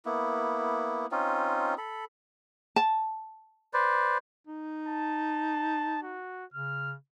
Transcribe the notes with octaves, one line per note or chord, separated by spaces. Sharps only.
A#3 B3 E4
C4 C#4 D#4 F4
A4 B5
A5
B4 C5 D5
D#4
A5
F#4
C#3 F6